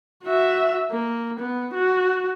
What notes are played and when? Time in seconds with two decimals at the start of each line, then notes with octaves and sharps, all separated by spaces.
0.24 F#4 E5
0.91 A#3
1.39 B3
1.74 F#4